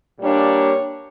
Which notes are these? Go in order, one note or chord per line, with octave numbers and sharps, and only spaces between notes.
A#2 G3 A#3 D4 C#5